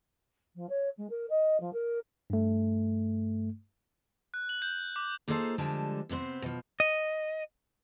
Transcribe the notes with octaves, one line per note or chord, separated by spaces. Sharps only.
F3
C#5
G#3
A#4
D#5
F3
A#4
G2 A3
F#6
F#7
G6
D6
A#3 D#4 F4 G#4 A4 C5
D3 F3 G3 G#3 A5
C3 B3 C4 C5
B2 F3
D#5